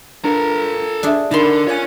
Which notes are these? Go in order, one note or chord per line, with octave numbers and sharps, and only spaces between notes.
D4 F4 A4 A#4 A#5
D4 G#4 E5
D3 D#4 A#4 A5 B5 C6
F4 C#5 G#5 F#6